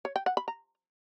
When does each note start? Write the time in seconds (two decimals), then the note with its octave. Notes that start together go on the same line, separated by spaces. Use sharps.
0.05 C#5
0.16 G5
0.26 F#5
0.37 B5
0.48 A#5